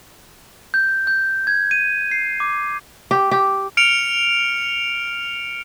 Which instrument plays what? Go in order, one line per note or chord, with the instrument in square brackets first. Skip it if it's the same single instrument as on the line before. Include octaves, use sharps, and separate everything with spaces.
[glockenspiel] G6
G6
G#6
D#7
C7
D6
[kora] G4
G4
[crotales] F6 C#7 D7 F7